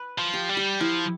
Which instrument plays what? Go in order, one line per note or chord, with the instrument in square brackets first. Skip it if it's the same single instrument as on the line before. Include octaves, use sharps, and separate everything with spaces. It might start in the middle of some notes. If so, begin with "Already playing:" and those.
Already playing: [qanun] B4
[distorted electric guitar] F3
[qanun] G4
[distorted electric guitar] G3
[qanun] G4
[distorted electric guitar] F3 [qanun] E4